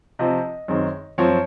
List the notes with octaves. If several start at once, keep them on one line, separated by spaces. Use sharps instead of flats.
C3 F3 C4 D#5
F#2 D#3 G#3 C4
F#2 F3 C4 C#5